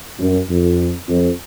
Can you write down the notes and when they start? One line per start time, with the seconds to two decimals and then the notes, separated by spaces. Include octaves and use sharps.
0.20 F#2
0.50 F2
1.09 F2